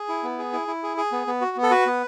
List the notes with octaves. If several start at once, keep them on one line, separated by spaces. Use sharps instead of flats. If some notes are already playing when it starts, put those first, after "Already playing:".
Already playing: G#4
E4
B3
G#4
E4
E4
G#4
G#4
B3
B3
F#4
B3
A4
F#4 B4
B3